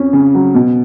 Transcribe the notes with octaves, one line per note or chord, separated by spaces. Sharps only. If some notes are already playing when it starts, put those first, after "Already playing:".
Already playing: F2 C#4
C#3
F#3
B2